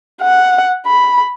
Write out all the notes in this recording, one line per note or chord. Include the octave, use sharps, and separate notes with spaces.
F#5
B5